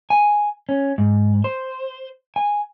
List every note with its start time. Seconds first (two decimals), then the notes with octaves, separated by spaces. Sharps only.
0.10 G#5
0.69 C#4
0.98 G#2
1.44 C5
2.36 G#5